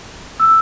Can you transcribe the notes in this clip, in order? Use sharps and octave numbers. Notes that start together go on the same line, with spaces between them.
E6